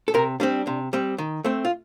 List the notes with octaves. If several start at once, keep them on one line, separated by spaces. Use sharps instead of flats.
A4
C3 A#4
G3 C4 D4
C3
G3 C4
D#3
A3 C4
F4